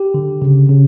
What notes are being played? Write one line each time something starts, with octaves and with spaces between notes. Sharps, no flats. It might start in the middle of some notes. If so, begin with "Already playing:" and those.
Already playing: G4
D3
C#3
C#3